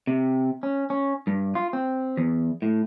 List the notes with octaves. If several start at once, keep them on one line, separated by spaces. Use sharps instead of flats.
C3
C#4
C#4
G2
F4
C4
E2
A2